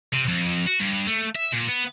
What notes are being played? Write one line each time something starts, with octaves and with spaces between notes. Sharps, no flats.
C3
F2
F#4
G2
A3
E5
A#2
B3